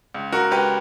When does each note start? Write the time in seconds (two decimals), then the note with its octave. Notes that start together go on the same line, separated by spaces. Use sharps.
0.14 C#2
0.32 F#4 A#4
0.51 C#2 G4 B4